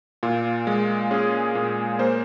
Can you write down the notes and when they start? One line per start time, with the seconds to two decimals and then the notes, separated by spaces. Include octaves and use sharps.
0.23 A#2 F4
0.67 G#3
1.11 C#4 G#4
1.55 A#2
1.99 A#3 C5